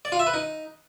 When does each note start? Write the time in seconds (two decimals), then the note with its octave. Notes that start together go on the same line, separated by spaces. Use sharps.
0.05 D5
0.12 F4
0.19 E5
0.27 B4
0.34 D#4